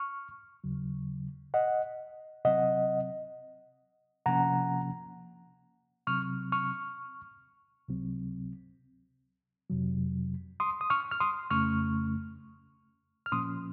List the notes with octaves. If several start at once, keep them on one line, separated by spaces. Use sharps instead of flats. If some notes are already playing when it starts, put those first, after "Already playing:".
Already playing: C#6 F6
D#2 C#3 F#3
D#5 F#5
C3 F#3 C4 D#5 F#5
C3 F3 A#3 C#4 F#5 A#5
C3 F#3 C4 C#6 F6
C#6 F6
C#2 C3 F#3 C4
F2 C3 F#3
C6 D#6
D#6
C#6 F6
F6
C6 D#6
F2 C#3 A3 C#4 C#6 F6
F6
A#2 F3 A#3 C#4 C6 D#6